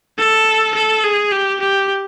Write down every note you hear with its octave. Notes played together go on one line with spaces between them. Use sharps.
A4
A4
G#4
G4
G4